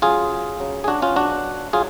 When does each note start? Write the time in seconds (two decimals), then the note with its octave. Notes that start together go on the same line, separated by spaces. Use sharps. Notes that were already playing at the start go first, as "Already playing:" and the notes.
0.02 C#3 F#3 F4 G#4
0.60 C#3 F#3
0.84 G#4
0.88 D4 F#4
1.02 C#4 F4
1.16 B2 F#3 D4 F#4
1.73 F#3 F4 G#4